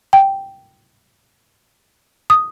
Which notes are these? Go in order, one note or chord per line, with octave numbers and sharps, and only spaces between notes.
G5
D#6